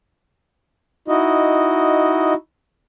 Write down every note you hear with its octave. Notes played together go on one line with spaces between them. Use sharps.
D#4 E4 F#4 D#5